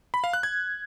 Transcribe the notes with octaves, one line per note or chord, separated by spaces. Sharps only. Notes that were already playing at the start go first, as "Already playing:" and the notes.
B5
F5
F#6
G#6